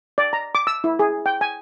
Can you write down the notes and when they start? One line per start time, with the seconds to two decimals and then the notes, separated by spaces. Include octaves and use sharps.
0.18 D5
0.33 A#5
0.55 D6
0.67 E6
0.84 E4
0.99 G#4
1.26 G5
1.41 G#5